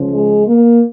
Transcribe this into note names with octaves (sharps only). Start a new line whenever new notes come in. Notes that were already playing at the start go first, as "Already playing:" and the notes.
Already playing: C#2 C#3 F3
G#3
A#3